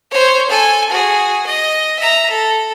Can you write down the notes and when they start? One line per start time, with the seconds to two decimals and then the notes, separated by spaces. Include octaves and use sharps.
0.11 C5 C#5
0.49 A4 G#5
0.90 F#4 G#4
1.46 D#5
1.99 E5 A#5
2.30 A4